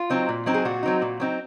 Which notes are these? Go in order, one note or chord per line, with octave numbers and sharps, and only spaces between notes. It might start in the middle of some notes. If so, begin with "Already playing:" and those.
Already playing: F4
F#3 C4 D#4
A#2
F#3 C4 D#4
G#4
A#2 F#4
F#3 C4 D#4
A#2
F#3 C4 D#4